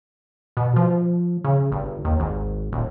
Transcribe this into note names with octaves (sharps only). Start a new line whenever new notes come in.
B2
F3
C#3
G1
D#2
G#1
D#1